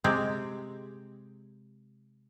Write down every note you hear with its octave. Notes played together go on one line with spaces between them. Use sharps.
C3 G#3 C4 G4